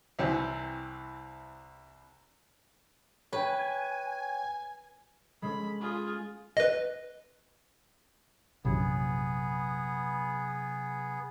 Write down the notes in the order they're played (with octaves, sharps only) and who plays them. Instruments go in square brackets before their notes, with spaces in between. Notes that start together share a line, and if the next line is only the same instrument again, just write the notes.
[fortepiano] C2 E3 C4 G#5
[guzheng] B4 [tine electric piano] C#5 G5 [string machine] G#5
[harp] G#3 C#4 A4 [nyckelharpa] B5
[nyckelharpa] F4 G#4
[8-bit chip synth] B4 D#5
[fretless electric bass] A#1 F#2 E3 [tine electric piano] C3 F#3 [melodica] B3 G#4